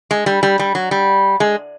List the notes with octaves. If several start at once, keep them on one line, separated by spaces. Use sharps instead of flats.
G#3
G3
G3
G3
F#3
G3
G#3